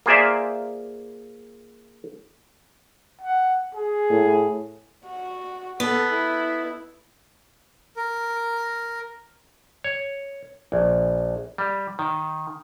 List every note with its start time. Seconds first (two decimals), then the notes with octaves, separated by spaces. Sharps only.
0.06 A#3 F4 G#4 C5 D5 E5
3.22 F#5
3.75 G#4
4.10 A2
5.06 F#4
5.80 B3 A4
6.13 E4
7.97 A#4
9.84 C#5
10.72 A#1
11.58 G3
11.99 D#3